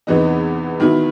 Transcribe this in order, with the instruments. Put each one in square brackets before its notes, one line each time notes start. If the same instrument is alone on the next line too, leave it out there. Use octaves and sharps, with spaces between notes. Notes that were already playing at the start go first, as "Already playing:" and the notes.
[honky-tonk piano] E2 C3 E3 B3 D#4
D#3 F#3 B3 E4